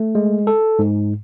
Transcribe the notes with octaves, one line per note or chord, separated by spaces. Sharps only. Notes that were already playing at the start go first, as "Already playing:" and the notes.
Already playing: A3
G#3
A4
G#2